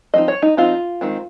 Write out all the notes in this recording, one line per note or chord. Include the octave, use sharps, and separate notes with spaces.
F3 C4 D#4 D#5
C#5
D#4
F3 C4 D#4 F4
D#3 G#3 C4